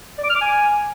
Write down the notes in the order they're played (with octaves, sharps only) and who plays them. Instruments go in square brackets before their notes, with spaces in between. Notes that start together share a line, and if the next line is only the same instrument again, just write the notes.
[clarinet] D5
D6
F6
D6
G#5